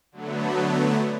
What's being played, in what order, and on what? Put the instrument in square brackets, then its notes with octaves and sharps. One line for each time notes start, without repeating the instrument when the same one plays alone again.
[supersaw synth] D3 F#3 A3 B3